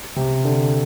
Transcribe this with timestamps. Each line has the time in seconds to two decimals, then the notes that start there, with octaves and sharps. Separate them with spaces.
0.16 C3
0.45 D3